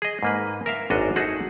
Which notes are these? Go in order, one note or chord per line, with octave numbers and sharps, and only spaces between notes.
G#4 D#5
G#2 A#3 B4
A#4 E5 F5
G#1 F#2 D4 F#4 D#5
D#4 F#4 G#4 A4 F#5